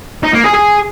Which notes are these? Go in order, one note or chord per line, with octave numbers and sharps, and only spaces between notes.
D#4
A#3
G#4
G#4